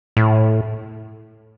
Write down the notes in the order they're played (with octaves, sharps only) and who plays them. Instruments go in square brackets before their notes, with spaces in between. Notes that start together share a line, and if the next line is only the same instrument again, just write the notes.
[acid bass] A2